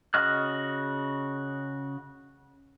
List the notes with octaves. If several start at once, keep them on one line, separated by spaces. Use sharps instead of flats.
C#3 F#4 D#5 F6 F#6